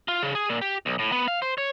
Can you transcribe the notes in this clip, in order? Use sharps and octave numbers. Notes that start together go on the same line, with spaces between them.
F4
C#3
G#4
A#2
G4
B1
A2
B3
F5
C5
C#5